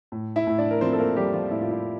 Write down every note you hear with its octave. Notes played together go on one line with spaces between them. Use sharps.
A2
E4 E5
A2
D4 D5
A#4
F3 C4 C5
A4
A#3 A#4
F3 G3 G4
F3 F4
A2 E4
F4
E4